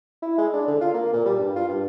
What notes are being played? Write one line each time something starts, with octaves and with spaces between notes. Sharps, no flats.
E4
G#3
D4
D3
F4
A#3
A#2
G3
G2
F4
G2